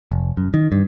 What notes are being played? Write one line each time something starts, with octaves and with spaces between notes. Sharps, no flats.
F1
F#2
D#3
G2